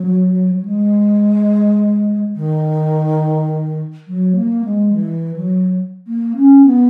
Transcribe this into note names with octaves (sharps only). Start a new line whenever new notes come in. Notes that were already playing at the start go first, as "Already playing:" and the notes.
Already playing: F#3
F#3
G#3
D#3
F#3
A#3
G#3
E3
F#3
A#3
C#4
B3